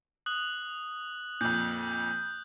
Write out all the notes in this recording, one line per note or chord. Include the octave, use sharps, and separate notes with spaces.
D#6 F#6 F#7
F2 A#2 G6